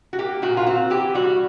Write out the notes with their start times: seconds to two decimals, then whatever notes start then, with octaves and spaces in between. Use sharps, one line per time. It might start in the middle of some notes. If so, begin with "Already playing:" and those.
0.13 F#4
0.19 A#3 G4
0.42 A#2 F#4
0.57 F4
0.67 C4 F#4
0.90 E3 G4
1.15 G3 F#4